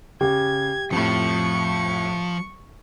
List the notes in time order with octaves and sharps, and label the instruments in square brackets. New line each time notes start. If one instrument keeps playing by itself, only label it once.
[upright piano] C#3 [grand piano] G4 [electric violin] G#6
[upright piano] F2 A2 [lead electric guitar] F3 [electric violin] C#6 C#7